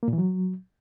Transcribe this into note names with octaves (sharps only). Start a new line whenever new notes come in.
A#3
A#2
E3
F#3